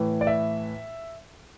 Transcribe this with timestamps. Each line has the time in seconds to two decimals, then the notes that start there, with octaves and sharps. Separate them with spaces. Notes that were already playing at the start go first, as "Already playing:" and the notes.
Already playing: A2 E3
0.21 D5
0.27 E5